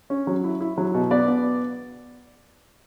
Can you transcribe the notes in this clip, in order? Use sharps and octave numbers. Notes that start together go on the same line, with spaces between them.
C#4
F#3
E4
E4
F#3
B2
B3 D5
B3